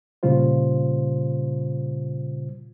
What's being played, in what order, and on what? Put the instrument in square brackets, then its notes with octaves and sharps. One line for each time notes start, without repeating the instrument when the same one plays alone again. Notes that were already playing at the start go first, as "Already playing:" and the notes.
[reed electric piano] A#2 C#3 G3 F4 C5